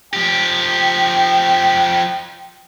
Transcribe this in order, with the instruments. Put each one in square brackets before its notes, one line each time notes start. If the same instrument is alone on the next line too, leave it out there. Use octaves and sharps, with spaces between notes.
[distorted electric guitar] F3 G4 [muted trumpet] G5